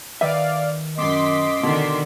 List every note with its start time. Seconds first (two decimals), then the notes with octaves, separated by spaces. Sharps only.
0.21 D#3 B4 D5 E5 F5
0.97 F#2 D#5 C6 D6 B6
1.63 B2 D3 D#3